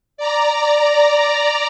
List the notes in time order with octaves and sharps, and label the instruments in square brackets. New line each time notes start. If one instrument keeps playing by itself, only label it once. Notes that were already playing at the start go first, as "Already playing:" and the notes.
[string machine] D5 A#5